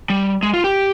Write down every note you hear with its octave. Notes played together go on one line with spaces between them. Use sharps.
G3
G#3
F4
G4